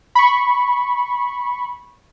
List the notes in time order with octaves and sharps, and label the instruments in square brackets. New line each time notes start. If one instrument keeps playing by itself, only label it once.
[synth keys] B5 C#6